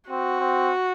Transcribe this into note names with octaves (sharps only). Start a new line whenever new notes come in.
C4 F#4
C4